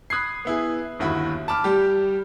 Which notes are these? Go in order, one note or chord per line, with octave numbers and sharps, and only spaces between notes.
B5 D#6 F#6 G#6 C7
B3 E4 G#4
G1 D#2 E4 F#4 B5
A5 B5 D6 F6
G3 G4